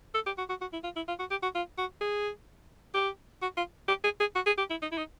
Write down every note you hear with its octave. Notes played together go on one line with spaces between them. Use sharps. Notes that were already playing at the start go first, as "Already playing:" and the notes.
A4
G4
F#4
F#4
F#4
E4
F4
E4
F4
F#4
G4
F#4
F4
F#4
G#4
G4
F#4
F4
G4
G#4
G#4
F#4
G#4
G4
E4
D#4
E4
D#4